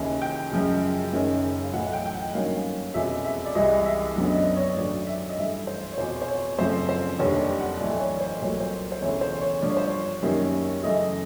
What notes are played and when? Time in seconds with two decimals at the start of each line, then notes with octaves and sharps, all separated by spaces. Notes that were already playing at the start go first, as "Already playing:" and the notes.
Already playing: D#2 C#3 E3 G#5
0.22 G5
0.52 F#2 C#3 F3 G#3
1.12 F#1 F#2 D#3 G#3 C#4
1.63 F5
1.73 B1 A2 E3 F#5
1.87 F#5
1.93 G5
2.06 G5
2.14 F#5
2.33 G2 D#3 F#3 A#3 C#4 F5
2.94 F1 E2 B2 G#3 C#4 E5
3.24 E5
3.45 D5
3.55 C2 C3 E3 G#3 D#5
3.85 E5
4.16 F#2 D3 F#3 B3
4.29 D#5
4.36 D5
4.56 C#5
4.76 G#1 F#2 D3 F#3 D5
5.07 E5
5.29 D#5
5.37 G2 E3 A3 E5
5.67 C5
5.93 C#5
5.98 F1 E2 B2 C5
6.22 C5
6.28 C#5
6.58 F#2 C#3 F3 A3 C4 C5
6.89 C5
7.19 F1 D#2 D3 G3 C#5
7.39 D5
7.60 F#5
7.80 B1 A2 E3 D5
8.00 C#5
8.20 C5
8.40 C2 A#2 F#3 A3 C#5
8.60 C5
8.92 C5
9.01 E1 D2 C#3 E3 A3 C#5
9.21 C5
9.41 C#5
9.62 G2 D3 F3 D5
9.70 C#5
9.77 C5
9.84 C#5
10.22 F#2 D#3 G3 A#3 C#4
10.83 F#2 C#3 E3 A3 D#5